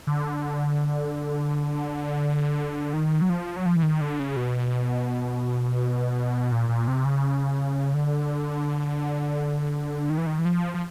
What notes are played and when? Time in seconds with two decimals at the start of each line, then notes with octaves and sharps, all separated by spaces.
0.07 D3
2.93 D#3
3.22 F#3
3.29 F3
3.56 F#3
3.66 F3
3.76 E3
3.83 D#3
4.01 D3
4.20 C#3
4.37 B2
6.52 A#2
6.69 A#2
6.88 C3
7.05 C#3
7.94 D3
10.10 D#3
10.18 E3
10.26 D#3
10.39 E3
10.45 F3
10.74 F3